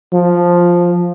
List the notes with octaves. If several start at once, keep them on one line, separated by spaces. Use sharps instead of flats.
F3